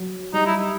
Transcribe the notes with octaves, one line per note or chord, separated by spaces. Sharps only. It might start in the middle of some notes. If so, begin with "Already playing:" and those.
Already playing: F#3
G3 D#4
E4